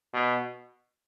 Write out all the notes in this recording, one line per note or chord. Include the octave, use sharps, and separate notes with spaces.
B2